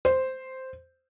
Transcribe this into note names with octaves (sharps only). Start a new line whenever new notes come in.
C5